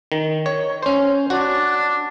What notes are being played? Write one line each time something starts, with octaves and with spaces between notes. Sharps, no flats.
D#3
C#5
C#4 C5
D4 F#4